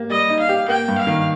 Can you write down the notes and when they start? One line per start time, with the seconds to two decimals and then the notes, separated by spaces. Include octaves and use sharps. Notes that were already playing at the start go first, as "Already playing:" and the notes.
Already playing: A#3 G4
0.10 G3 D#5
0.30 D#4
0.39 F5
0.49 G4
0.68 A#3 G5
0.88 G2
0.98 F5
1.07 D#3